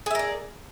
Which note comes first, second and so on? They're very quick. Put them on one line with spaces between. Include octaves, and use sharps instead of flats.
G#4 E5 A#4 D5